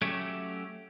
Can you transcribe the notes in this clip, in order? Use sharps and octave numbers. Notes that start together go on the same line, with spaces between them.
F#3 A3 C#4 G4